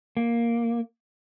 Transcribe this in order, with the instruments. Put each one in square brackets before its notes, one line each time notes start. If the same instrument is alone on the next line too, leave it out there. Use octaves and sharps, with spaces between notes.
[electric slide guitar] A#3